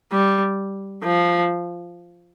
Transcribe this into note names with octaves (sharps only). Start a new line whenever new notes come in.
G3
F3